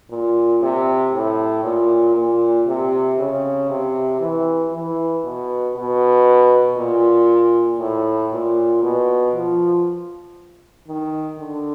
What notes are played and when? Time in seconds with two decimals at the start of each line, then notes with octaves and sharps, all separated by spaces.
0.10 A#2
0.62 C3
1.14 A2
1.64 A#2
2.15 A#2
2.67 C3
3.19 C#3
3.69 C3
4.20 E3
4.72 E3
5.24 B2
5.75 B2
6.78 A#2
7.79 A2
8.32 A#2
8.83 B2
9.34 F3
10.88 D#3
11.39 D3